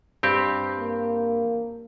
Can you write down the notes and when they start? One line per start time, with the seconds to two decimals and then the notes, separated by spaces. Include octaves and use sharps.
0.23 G2 C4 G4
0.77 A#3